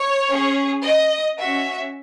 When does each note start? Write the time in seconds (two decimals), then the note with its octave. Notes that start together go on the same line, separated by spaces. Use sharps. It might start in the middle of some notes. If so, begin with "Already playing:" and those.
Already playing: C#5
0.29 C#4 G#4
0.83 D#5
1.38 C#4 F#4 E5